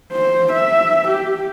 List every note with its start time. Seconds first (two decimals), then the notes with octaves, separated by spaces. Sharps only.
0.12 C5
0.53 E5
1.08 G4